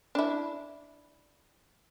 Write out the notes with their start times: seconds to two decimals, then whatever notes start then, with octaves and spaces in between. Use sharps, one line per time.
0.15 D4 E4